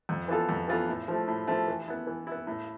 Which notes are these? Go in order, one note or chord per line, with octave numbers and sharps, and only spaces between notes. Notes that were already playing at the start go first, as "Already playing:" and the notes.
F2
E3 B3 F4 A4
F2
E3 B3 F4 A4
A2
F3 A3
A2
F3 A3
E3
B3 E4
E3
B3 E4
A2